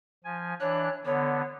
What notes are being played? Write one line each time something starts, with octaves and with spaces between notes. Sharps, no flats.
F3 G#5
E3 D4 C#5 F#6
D3 B3 C#5